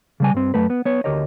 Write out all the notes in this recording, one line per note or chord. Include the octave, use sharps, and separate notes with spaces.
C#3 G3 G#5
G2 C4
F#2 A3 B4
B3
B3 C#5
D2 G4 A#4 C#5 D#5